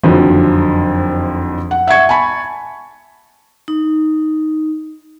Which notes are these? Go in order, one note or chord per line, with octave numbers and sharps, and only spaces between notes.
F#1 F2 D3 D#3 F3 F#3
F#5
E5 F#5 C#6 G#6 C#7
G#5 A5 B5 C#6
D#4